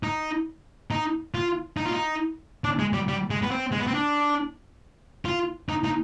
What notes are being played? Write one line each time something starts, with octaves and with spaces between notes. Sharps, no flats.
D#4
D#4
F4
D#4
F4
D#4
D4
G#3
G3
G3
G#3
B3
C4
G#3
B3
C4
D4
F4
D#4
D#4